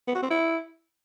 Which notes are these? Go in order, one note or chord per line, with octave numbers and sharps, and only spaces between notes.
B3
F#4
C4
E4